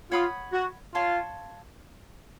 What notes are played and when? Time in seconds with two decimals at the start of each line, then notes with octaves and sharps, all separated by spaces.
0.11 F4 C#5 F#5 B5 D#6
0.53 F#4
0.94 F4 C#5 F5 A5 C6